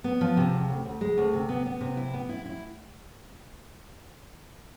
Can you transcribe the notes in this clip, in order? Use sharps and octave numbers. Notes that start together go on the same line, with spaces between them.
B3
F3
C3
E2
D2
D2
G#3
D2
C3
B3
B3
C3
E4
B3
E4
E4